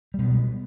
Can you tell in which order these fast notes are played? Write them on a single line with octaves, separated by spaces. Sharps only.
G3 B2 B3